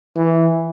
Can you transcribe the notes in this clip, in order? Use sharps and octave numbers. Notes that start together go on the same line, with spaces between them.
E3